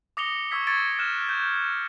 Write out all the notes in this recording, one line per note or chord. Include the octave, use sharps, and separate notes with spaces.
D6 D#6 A#6 C#7 F7 G7
C#6 D#6 E6 G#6 B6
C#6 E6 G#6 A6 C#7 D7
F6 F#6 E7
G6